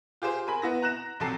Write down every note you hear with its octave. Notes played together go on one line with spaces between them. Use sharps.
F4 G4 G#4 C5
A#4 G#5 B5
B3 E4 A#6
A#5 F#6 A#6 E7
A#1 C3 F#3 A4 A5 C7